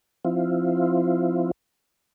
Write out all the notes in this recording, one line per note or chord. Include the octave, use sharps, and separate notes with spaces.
F3 C4 E4 F4